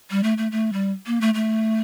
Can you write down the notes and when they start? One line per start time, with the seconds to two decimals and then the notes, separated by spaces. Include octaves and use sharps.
0.11 G3
0.23 A3
0.38 A3
0.52 A3
0.73 G3
1.07 A#3
1.21 A3
1.34 A3